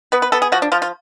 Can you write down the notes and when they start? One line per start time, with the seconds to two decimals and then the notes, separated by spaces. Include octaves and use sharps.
0.12 B3 B4
0.22 B4
0.32 B3 A4
0.42 G#4
0.52 F3 F#4
0.62 D4
0.72 F3 F4
0.82 F4